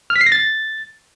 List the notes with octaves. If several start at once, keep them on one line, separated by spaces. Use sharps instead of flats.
F6
B6
C7
A#6
A6